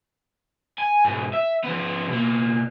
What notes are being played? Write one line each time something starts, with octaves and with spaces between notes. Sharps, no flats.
G#5
G#2 B2
E5
F3 B3
B2 A#3